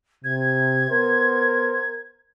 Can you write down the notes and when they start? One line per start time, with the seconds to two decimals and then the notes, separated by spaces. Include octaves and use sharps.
0.24 C3 G#6
0.90 B3 A#4 C5